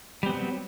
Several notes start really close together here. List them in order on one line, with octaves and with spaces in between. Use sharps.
G3 C4 B3 F#3